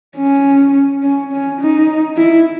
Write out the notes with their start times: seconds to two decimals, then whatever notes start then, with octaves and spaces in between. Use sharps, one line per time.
0.17 C#4
1.03 C#4
1.32 C#4
1.60 D#4
2.17 E4